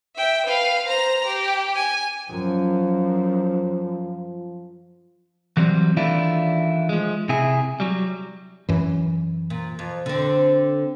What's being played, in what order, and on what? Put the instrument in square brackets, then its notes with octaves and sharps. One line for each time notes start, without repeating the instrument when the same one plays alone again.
[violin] E5 G5
B4 F5
C5 A#5
G4
G#5
[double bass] F#2 [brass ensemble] F3
[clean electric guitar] E3 F#3 G3 C4
D#3 E3 A3 D4 E4 F4
F3 G#3
C3 E4 G#4
F#3 G3
[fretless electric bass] F#2 E3
[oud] A#2
F2
D3 C4